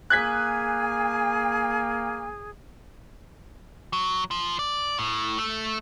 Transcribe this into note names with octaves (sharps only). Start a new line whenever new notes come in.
A#3 G#4 G#5 F#6 G#6 B6
F#3
F3
D5
A2
A3